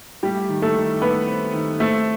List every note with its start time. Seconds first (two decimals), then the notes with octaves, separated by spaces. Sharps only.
0.23 G3 A3 G4
0.49 D#3
0.62 A3 A4
0.76 D#3
1.01 A3 B3 B4
1.27 C4
1.54 D#3
1.80 A3 C4 A4